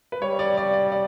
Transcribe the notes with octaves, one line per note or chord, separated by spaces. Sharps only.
B4
G3 C#5
D5
D5
D5
D5